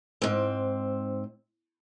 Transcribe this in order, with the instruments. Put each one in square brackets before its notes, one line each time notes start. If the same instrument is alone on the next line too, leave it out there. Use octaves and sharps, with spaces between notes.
[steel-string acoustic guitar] G#2 C4